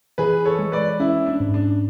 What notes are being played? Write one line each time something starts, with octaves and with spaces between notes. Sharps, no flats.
E3 G#4 B4
A4 C#5
G#3
B4 D5
C#4 E4
D4
G#2
D4